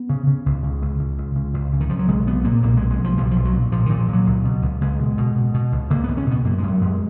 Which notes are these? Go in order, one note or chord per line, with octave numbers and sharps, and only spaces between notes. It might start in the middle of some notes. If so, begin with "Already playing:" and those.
Already playing: B3
C#3
C#3
C#2
C#3
C#2
C#3
C#2
C#3
C#2
C#3
D#3
C#3 F3
F#3
B1 G#3
B1 B3
A#2 A#3
B1 A#3
B1 G#3
G#3
B1
F3
B1 F3
F3
B1
F#3
A#2
A#2 F3
A#2 D#3
F3
A#2 F#3
C#2
B2
C#2
C#2 G#3
B2
B2
B2
B2
C#2
C#2 A#3
B3
C#2
C#4
B2 B3
F#2 A#3
F#2 G#3
F#3
F#2 G#3